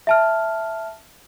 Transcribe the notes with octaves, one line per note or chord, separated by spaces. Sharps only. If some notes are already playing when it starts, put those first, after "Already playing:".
E5 A5 F6